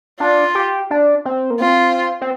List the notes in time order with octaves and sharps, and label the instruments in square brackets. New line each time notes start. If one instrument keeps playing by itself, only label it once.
[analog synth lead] D4 [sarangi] F4
[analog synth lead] G4
D4
C4
A#3
[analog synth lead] C4 [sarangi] F4
[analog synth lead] C4